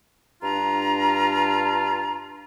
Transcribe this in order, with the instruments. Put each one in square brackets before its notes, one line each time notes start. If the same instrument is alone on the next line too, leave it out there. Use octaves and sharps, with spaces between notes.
[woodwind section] G2 D4 F4 A#5